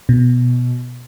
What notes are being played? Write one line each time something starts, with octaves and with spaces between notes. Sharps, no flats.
B2